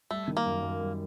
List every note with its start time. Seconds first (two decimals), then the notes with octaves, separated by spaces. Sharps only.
0.11 G3 A3
0.28 D#3
0.37 A#3
0.45 F#2
0.62 F#2
0.80 G3